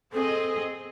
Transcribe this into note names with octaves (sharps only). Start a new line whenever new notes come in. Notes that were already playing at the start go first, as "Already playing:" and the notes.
C4 G#4 A4 D#5